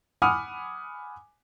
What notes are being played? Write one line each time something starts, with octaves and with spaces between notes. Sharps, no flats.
F#5 G#5 B5 D6 D#6 F6